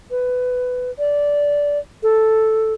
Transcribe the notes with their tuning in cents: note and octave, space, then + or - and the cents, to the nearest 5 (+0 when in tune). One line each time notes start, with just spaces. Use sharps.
B4 +15
D5 -15
A4 +0